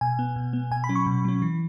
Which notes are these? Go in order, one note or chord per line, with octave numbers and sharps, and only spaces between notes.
B2 G#5
B3
B2
B3
B2 G#5
B5
F#3 C#4
C#6
B2
F#3 C#4
E3